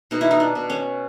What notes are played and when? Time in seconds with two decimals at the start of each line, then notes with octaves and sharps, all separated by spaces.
0.11 B2 D#4
0.21 E4
0.31 D#4
0.40 D4
0.55 B2
0.70 C#4